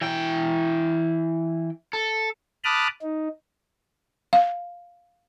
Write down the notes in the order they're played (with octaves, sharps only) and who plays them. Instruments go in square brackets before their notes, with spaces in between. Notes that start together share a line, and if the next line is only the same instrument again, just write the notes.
[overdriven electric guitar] E3 G5
A4
[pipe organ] A5 B5 D6 D#6 F6 F#6
D#4
[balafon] F5